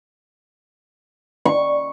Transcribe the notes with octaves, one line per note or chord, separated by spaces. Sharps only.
D5 C#6